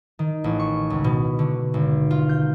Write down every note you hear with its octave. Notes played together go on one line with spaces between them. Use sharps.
D#3
A1
C#6
C#2
B2
D3
G#1
F4
G6